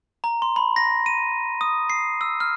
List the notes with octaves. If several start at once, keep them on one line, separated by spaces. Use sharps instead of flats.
A#5
C6
B5
A#6
D#7
D#6
C7
E6
F6